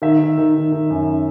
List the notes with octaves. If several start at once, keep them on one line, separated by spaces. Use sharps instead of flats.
D#3 E5
D#3
D#3
D#3
D#3
F#2